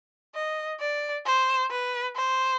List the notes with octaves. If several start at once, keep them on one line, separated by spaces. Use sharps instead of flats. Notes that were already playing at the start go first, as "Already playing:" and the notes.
D#5
D5
C5
B4
C5